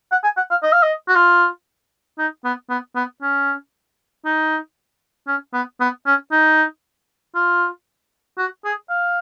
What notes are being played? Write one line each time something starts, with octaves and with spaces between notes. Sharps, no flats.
F#5
G#5
F#5
F5
D#5
F5
D#5
F#4
F4
D#4
B3
B3
B3
C#4
D#4
C#4
B3
B3
C#4
D#4
F4
F#4
G#4
F5